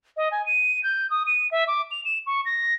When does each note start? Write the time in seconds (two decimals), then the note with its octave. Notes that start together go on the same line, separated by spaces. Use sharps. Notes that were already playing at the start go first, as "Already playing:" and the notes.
0.17 D#5
0.32 G#5
0.46 D#7
0.83 G6
1.10 D#6
1.27 D#7
1.51 E5
1.68 D6
1.91 F7
2.05 E7
2.27 C#6
2.45 A#6